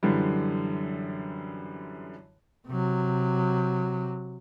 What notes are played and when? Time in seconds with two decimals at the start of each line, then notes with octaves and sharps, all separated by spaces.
0.03 F#2 D3 E3 G3
2.67 C3 F#3